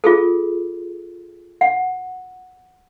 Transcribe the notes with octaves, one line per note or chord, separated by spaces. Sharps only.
F4 G#4 A4
F#5